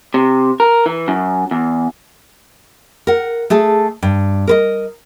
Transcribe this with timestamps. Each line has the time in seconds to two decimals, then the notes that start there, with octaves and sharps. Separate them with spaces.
0.14 C3
0.60 A#4
0.86 E3
1.08 F#2
1.51 E2
3.07 A#4 F#5
3.50 A3 G#4 A4 A5
4.03 G2
4.47 A#4 B4 D#5